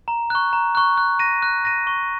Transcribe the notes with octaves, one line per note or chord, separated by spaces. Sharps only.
A#5
C#6 F#6
A#5
C#6 F#6
F#6
A#6 D#7
F#6
A#6 D#7
C#6